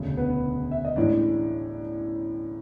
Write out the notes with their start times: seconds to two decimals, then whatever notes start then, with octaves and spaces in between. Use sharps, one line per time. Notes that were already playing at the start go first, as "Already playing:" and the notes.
Already playing: E1 D2 C#3
0.17 B3 B4
0.71 E5
0.85 D#5
0.96 A1 A2 E3 G#3 D4 D5